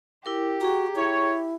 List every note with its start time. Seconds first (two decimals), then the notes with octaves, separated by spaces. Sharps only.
0.25 E4 G4 A#4 D6
0.61 F#4 G#4 G5 A#5
0.96 E4 C#5